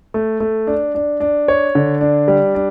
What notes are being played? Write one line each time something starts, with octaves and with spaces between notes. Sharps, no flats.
A3
A3
D4
D4
D4
C#5
D3
D4
G3
D4